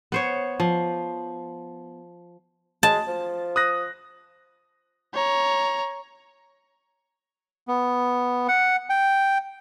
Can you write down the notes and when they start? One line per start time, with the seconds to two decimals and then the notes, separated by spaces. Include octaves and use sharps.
0.12 B3 C5 C#5
0.60 F3
2.83 G#3 A5
3.07 F3
3.56 D#6 F#6 A#6
5.14 C#5 A#5
7.68 B3
8.48 F#5
8.90 G5